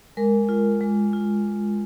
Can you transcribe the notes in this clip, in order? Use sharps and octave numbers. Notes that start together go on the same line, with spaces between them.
G#3 A#4
F4
G#3
F4